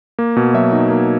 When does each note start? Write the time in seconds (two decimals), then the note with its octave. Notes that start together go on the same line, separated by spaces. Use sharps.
0.19 A#3
0.37 B2
0.54 F#3 E5
0.72 D#4
0.90 A#3